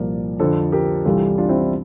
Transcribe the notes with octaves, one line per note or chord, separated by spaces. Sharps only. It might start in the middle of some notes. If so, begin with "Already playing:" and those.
Already playing: C2 A#2 F3 A#4 D5
F2 D3 F3 A4 C5
G4 A#4
C2 C3 E3 G3 F4 A4
D4 F4
C4 E4
D4